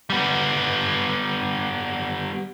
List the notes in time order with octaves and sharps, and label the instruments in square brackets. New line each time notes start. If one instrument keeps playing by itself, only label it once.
[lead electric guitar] G3 B3